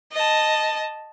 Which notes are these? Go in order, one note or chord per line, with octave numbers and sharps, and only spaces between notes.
D#5 A5